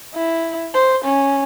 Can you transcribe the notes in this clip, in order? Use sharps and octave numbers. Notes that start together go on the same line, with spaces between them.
E4
C5
C#4